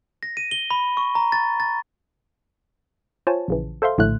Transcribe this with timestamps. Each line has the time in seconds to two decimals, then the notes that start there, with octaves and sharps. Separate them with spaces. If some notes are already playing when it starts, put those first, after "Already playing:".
0.23 A#6
0.37 D#7
0.51 G7
0.71 B5
0.97 C#6
1.15 A#5
1.32 A6
1.60 A6
3.27 F4 C5 C#5 G#5 A5
3.48 A#1 C#3 E3
3.82 A4 C5 E5 F5 C6
3.98 A#1 A2 D3 A3 F#6